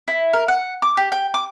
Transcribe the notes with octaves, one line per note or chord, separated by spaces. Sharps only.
E4
A#4
F#5
D6
G4
G5
D6